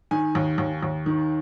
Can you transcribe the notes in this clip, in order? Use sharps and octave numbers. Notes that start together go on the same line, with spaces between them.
D#3 G#5
D#2
D#2
D#2
D#3